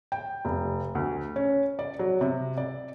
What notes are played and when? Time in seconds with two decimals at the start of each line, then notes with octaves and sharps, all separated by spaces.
0.12 G5
0.45 F1
0.95 D2
1.36 C#4
1.79 D5
1.99 F#3
2.21 C3
2.58 D5